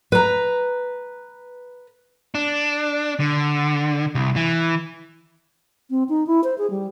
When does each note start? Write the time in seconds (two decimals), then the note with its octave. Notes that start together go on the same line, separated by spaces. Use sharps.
0.12 B4 A#5
2.35 D4
3.20 D3
4.15 C2
4.36 E3
5.90 C4
6.09 D#4
6.27 E4
6.44 C5
6.58 G#4
6.70 G3